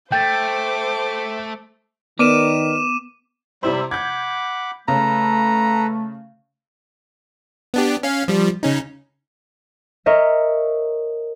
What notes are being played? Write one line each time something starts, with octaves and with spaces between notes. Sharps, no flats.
A3 C5 G5 D6 G6 A6
D#3 B3 A#4 B4 D5 D6 D#7 E7
C3 G3 E4 C5 E5 B5
F#5 B5 D6 G6 G#6
C#3 A3 A4 B4 A#5
B3 D4 G4
C#4 F5
F3 G3
C#3 C#4 D#4
A#4 C#5 D#5 E5